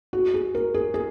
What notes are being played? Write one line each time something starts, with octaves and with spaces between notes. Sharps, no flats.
F#4
G#4
A#4
G#4
G#4